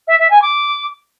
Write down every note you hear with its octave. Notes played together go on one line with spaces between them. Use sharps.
E5
E5
G#5
D6